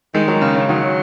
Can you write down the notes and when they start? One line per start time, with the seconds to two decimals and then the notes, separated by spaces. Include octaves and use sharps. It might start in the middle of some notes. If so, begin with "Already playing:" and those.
0.14 D#3 G#3
0.28 F#3
0.41 C#3
0.55 C#3
0.69 D#3 F#3